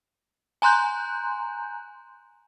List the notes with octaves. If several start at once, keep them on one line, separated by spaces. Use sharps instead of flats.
G#5 A#5 C6 F#6 G6